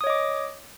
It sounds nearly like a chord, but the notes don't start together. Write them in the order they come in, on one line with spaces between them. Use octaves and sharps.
D#6 C#5 D#5 D6